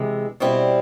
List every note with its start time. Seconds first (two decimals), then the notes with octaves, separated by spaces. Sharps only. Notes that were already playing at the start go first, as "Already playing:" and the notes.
Already playing: C3 E3 G#3
0.40 B2 G3 C4 E4